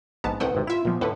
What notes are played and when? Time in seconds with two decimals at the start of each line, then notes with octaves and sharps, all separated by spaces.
0.24 A#1 G#2 B3 A5
0.40 C2 C3 A3 B4 F#5 G5 D#6
0.55 G#1 C3
0.67 E4 F4 E5 E7
0.85 A#2 F3 B3
1.01 A2 D3 B4 F#5